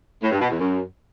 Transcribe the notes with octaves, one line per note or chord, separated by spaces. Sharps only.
A2
G2
B2
E2
F#2